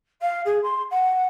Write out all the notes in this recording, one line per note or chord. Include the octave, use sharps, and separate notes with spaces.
F5
G#4
C6
F#5